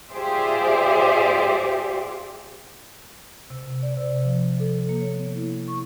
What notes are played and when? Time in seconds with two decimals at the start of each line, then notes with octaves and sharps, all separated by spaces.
0.11 F4 G4 G#4 C5 D5 E5
3.50 C3
3.83 D5
3.97 C3
4.24 F3
4.60 A4
4.89 A#3
5.01 C#5
5.17 B3
5.35 E4
5.68 C#6